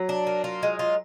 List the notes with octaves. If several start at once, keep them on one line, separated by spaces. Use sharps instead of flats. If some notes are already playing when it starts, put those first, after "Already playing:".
Already playing: F#3
D4
A#3
F4
G#3
F4